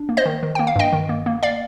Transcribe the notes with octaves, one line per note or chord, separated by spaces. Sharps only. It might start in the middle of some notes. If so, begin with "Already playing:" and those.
Already playing: D4
A#3
C5 D#5
D#3
D#3
A#3 G5
F5
G2 D#5 G5
D#3
A#3
A#3
D5 F5